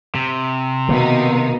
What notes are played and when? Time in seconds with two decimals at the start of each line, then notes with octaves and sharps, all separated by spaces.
0.15 C3
0.89 B2 D#3 A#3 D#4